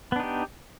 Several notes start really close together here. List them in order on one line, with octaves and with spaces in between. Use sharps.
B3 D4 D#4 G4